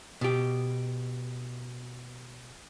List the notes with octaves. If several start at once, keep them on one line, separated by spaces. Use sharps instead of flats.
B2 G4